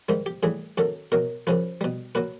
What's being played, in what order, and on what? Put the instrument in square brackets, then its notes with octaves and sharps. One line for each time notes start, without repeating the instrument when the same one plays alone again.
[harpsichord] G#2 D#3 G3
G4
A2 E3 G3 G#4
F#2 D#3 F#3 A4
B2 F#3 A#4
F#2 C#3 F3 B4
B2 G3
A#2 F#3 B4